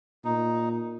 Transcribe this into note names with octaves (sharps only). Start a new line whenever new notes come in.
A#2 D#4